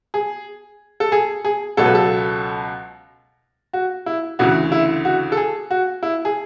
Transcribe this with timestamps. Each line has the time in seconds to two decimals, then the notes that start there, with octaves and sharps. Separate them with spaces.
0.14 G#4
1.00 A4
1.12 G#4
1.45 G#4
1.77 C#2 B2 F#3 A4
1.86 B4
1.95 A4
3.73 F#4
4.06 E4
4.39 D2 C#3 E3 F#4
4.72 E4
5.05 F#4
5.32 A4
5.37 G#4
5.71 F#4
6.03 E4
6.25 G#4